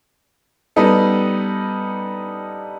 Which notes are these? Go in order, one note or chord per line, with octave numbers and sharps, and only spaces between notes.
G3 B3 D#4 A4